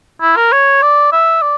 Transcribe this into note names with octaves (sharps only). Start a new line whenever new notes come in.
E4
A#4
C#5
D5
E5
D5